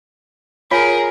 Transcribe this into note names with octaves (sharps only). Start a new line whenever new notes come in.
F4 G#4 A#4 C#5 F5